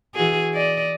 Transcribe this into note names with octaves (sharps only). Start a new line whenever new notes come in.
E3 F#4 G#4
D5 D#5